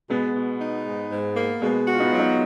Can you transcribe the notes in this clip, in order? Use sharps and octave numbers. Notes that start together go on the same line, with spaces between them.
B2 G#3 B3
B2
D#4
G#2
G#2
A#3
B2 G#3 B3
F#4
F4
B3 D#4
F#3 F4
B3 D#4